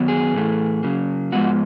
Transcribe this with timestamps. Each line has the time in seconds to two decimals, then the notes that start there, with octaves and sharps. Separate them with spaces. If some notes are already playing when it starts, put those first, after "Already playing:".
Already playing: F#2 D#3 F#3 B3
0.08 G#4
0.34 A2 E3 A3
0.83 C#3 F#3 A#3
1.32 G#2 F3 G#3 B3 F#4